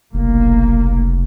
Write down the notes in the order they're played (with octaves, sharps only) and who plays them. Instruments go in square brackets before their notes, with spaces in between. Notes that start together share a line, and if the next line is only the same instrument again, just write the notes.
[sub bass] F1 [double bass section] B1 A#3